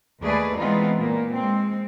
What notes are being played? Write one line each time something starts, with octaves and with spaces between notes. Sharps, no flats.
D#2 A3 G#4 B4 D5
E3 G#3 B3 C4 D#4 F4
A#2 A#3
G#3 C4